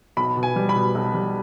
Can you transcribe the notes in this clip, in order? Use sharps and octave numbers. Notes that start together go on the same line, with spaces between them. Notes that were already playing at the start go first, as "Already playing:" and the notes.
B1 B5
B2
G#5
G3
B5
B2
B1
G3